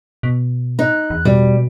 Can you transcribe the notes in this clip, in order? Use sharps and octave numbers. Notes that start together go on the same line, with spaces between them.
B2
D#4 F#6
E2
B2 G3